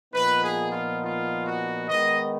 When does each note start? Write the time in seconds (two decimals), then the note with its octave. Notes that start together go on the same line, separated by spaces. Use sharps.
0.13 A#2 F3 B3 D#4 B4
0.42 G#4
0.71 F4
1.01 F4
1.45 F#4
1.88 D#3 G#3 B3 D#4 D#5